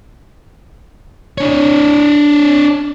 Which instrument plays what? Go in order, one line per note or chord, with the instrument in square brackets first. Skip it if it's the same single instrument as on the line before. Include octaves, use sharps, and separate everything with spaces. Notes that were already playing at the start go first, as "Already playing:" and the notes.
[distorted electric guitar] D4 C#5